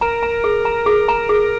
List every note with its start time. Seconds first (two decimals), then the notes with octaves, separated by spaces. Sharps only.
0.01 A#4 A#5
0.23 A#5
0.44 G#4
0.65 A#5
0.86 G#4
1.08 A#5
1.29 G#4